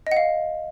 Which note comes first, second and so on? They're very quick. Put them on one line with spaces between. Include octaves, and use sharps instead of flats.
D#5 F#5 F5